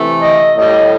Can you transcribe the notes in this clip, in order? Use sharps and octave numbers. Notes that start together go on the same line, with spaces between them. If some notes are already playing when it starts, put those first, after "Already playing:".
Already playing: C3 E3 A3
D#5
A2 G3 D#5